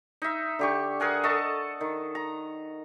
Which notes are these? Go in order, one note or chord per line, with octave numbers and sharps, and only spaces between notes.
D#4 E5
D3 G4 C#6
G#4 A#4 F#5 G#5
A4 D#5 A5 C#6
D#3
A#5